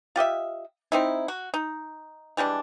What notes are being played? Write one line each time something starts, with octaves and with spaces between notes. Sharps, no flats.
F4 G4 D#5 E5
C4 D#4 E4
F#4
D#4
E3 G3 G#3 D4